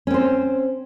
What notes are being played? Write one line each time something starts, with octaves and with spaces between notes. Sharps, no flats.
C4 C#4 C5